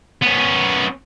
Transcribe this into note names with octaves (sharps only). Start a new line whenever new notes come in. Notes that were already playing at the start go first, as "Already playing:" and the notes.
B3 C#4